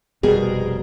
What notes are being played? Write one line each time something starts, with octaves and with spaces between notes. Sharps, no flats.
F1 B2 G3 G#4 A#4 C5